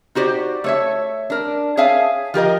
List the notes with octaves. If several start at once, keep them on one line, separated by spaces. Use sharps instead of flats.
D#4 F#4 G4 C5 D5
A3 C#5 E5
D4 A#4
G#4 C#5 E5 F5 G#5 A5
F3 G4 A#4 D#5